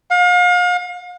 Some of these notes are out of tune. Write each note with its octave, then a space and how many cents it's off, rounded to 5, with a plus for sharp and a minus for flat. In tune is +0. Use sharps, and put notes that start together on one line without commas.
F5 +40